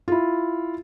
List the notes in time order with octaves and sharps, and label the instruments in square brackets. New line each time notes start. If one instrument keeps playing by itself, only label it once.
[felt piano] E4 F4